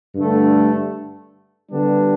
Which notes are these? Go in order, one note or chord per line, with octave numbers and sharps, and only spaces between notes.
G2 D3 A3
D3 G3 B3 D4